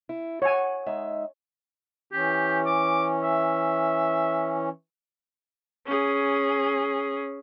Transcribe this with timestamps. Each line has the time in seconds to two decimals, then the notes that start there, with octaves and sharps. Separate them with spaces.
0.09 E4
0.42 C#5 F#5 G#5
0.86 G#3 D#4 E5
2.13 E3 C#4 G4
2.66 D6
3.23 E5
5.86 C#4 G#4